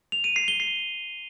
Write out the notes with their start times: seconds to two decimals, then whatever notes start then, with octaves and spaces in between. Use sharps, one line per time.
0.12 F7
0.24 D#7
0.36 C7
0.48 G7
0.60 C7